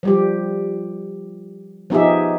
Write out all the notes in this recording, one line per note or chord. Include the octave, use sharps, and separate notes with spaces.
F3 G3 G4
F3 B3 D#4 G4 G#4 E5